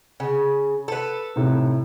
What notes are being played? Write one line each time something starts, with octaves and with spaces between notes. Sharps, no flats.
C#3
A4 B4
A2 C3 D#4